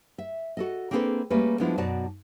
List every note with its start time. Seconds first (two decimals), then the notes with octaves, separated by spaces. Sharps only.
0.18 E5
0.57 F#4 A4 D#5
0.91 A#3 C4 D4 G#4 A4 B4
1.30 G3 A3 A#3 C#4 G#4 B4
1.60 F3 G#3 B3 D4 E4 F4
1.77 F#2 B2 D#4 F#4 D5 A5